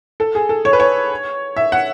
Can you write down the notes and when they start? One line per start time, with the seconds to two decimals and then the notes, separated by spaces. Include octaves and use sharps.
0.20 A4
0.35 G#4
0.49 A4
0.65 C#5
0.73 B4
0.80 C#5
1.56 E5
1.72 F#5